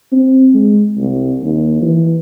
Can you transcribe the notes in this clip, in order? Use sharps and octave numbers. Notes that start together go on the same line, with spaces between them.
C4
G#3
C2
D#2
E3